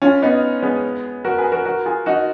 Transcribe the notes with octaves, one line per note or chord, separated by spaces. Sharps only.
C#4 F4
B3 D#4
G#3 B3
F#4 A#4
G#4 B4
F#4 A#4
F#4 A#4
F4 G#4
D#4 F#4